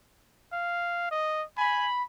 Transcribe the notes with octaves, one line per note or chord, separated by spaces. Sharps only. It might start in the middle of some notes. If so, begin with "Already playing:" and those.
F5
D#5
G#5 B5